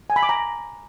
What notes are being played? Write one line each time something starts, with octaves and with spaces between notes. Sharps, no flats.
G#5
B5
D6
A#5